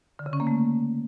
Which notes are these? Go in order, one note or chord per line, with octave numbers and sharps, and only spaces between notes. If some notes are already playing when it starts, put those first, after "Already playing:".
D3
C#3
C#4
A#3
A3